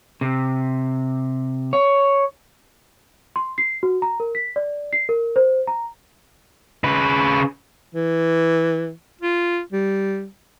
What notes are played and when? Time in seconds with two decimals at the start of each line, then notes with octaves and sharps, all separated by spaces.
0.21 C3
1.73 C#5
3.36 C6
3.58 C7
3.83 F#4
4.02 A#5
4.20 A#4
4.35 B6
4.56 D5
4.93 C7
5.09 A#4
5.36 C5
5.67 A#5
6.84 C#3 B4
7.95 E3
9.21 F4
9.73 G3